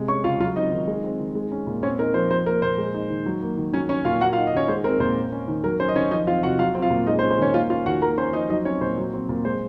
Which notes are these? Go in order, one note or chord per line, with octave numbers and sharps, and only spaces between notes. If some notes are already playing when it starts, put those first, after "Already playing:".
Already playing: C3 G#3
C#4 C#5 C#6
C#3 F4 F5
F#3 F4 F5
C4 D#4 D#5
D#3
G#3
C4
D#3
G#3
C#4
A#2
C4 C#4 C#5
D#4 A#4
F3 C5
F3 C5
A#3 A#4
A#2 C5
G#3
D#4
D#3
F#3
A#3
D#3
F#3 C#4 C#5
C#4 C#5
A#2 F4 F5
A#3 F#4 F#5
F4 F5
D#4
D#5
D#3 C#4 C#5
G#3 C5
C4 A#4
A#2 C5
A#3
C#4
D#3
F#3 A#4
C#4 C5
D#5
D#3 C#4 C#5
F3 D#4 D#5
C4 F4 F5
C3 F#4 F#5
F#3 F4 F5
C4
F4 F5
A#2
G#3 D#4 D#5
C5
C#4
C5
D#3 C#4 C#5
A#3 F4 F5
C#4 F4 F5
D#3 F#4 F#5
A#3 A#4 A#5
C#4 C5 C6
F3 D#4 D#5
F#3 D#4 D#5
C4 C#4 C#5
A#2 C5
F#3
C4
A#2
G#3 C5